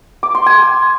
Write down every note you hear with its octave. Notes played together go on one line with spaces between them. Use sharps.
D6
C6
G#5